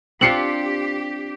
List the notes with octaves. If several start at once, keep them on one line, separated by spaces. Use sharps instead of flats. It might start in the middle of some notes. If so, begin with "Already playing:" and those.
C4 D4 F4 G4 C7 C#7 F#7